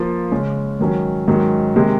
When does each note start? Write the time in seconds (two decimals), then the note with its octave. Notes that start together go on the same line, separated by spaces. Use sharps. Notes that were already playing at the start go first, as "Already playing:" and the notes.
Already playing: F3 A#3 F4
0.31 C#3 G#3 C#4
0.80 G#2 D#3 F#3 C#4
1.28 G#2 D#3 F#3 C#4
1.76 C3 D#3 G#3